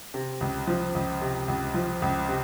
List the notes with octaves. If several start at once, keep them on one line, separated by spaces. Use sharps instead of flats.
C3
C#2
F3
C#2
C3
C#2
F3
C#2
C3